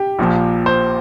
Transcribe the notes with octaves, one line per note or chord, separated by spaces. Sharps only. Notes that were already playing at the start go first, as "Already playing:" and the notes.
Already playing: G4
A#1 A#2 F3
C5